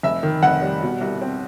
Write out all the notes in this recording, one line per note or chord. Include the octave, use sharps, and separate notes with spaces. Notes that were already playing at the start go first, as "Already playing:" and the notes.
F1 E5
D#3
F1 F#5
G3
B2
C2
C4